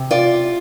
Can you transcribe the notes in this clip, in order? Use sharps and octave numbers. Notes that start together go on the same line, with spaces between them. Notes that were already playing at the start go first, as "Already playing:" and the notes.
Already playing: C3
F4 D5